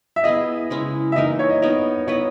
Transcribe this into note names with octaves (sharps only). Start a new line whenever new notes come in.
E5
B3 E4 G#4 D#5
C#3 G#3 C#4 E4
E5
E3 A#3 D#4 A#4 D#5
C#5
D#5
B3 D#4 A#4 D#5
B3 E4 B4 C#5 D#5